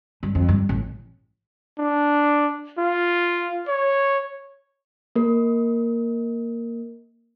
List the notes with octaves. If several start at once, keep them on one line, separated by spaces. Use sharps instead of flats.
G2
F2
G2
A1
D4
F4
C#5
A#3 A#4